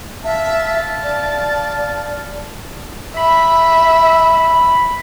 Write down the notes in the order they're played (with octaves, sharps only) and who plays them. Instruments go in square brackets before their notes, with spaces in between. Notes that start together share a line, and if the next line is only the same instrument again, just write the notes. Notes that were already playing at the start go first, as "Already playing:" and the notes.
[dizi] E5 [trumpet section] F5 A5
[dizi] D5
[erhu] E5 [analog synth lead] B5